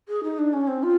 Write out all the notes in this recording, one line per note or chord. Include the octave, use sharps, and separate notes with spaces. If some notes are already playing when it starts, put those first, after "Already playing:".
G#4
D#4
D4
C#4
C4
F4